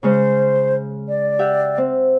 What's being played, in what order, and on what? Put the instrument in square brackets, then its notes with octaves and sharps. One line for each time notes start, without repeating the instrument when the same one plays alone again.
[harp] C#3 G#3 C#4 [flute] C5
[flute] D5
[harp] G4 E5 F#5
C4